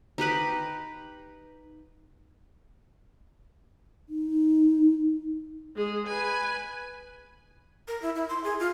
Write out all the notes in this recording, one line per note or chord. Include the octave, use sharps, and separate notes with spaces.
D#4 G4 B4 B5
D#4
G#3 G#4
B4 G#5
A#4
E4
E4
C6
G#4
F4